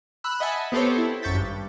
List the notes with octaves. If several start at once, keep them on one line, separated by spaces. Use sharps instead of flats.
B5 E6 F#6
D#5 E5 F#5 G#5 A5 B5
B3 C4 G4 A4 C5 C#5
E4
G#1 F#2 C#6 G6 A6 B6
G2